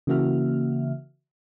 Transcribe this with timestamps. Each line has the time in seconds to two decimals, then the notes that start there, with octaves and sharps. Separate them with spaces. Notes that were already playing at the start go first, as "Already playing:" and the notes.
0.07 C#3 E3 A#3 F#4 E5 F6